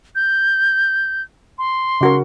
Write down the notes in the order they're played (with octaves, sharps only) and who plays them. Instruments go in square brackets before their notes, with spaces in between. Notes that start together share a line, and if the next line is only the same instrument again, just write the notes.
[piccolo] G6
C6
[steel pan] C#3 F#4 A#4